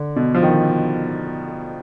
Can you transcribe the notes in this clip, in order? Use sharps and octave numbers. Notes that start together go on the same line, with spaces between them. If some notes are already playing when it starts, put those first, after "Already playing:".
Already playing: D3
B2
F3
D#3